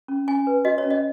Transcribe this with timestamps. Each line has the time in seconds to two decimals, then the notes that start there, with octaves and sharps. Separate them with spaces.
0.08 C#4
0.28 C#4 G#5
0.47 B4
0.65 F#4 D#5
0.78 C#5
0.84 C#4
0.90 D#5